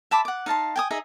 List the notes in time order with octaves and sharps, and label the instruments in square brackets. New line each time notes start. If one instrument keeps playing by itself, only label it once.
[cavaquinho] E5 A5 B5 D6
F#5 D6
D#4 F5 A5 C6
G5 G#5 D#6
D#4 G#4 D#5 E5